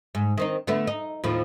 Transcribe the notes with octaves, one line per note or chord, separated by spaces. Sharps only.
G#2
D#3 C4 D#4
D3 A3 B3
D#4
D#2 A2 F3